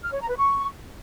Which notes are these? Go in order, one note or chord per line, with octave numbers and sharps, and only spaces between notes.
F6
C#5
A#5
B4
C#6